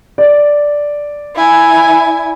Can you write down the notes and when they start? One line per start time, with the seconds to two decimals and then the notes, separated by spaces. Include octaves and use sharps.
0.18 D5
1.35 E4 G#5